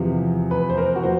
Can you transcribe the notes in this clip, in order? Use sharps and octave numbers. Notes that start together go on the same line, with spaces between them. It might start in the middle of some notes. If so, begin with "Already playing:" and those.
Already playing: E2 C3 F3
B4
C5
A#4
F#4
F3 C5